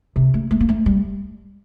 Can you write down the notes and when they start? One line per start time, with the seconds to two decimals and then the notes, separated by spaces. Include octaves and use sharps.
0.16 C3
0.34 A3
0.51 A3
0.60 A#3
0.69 A3
0.86 G3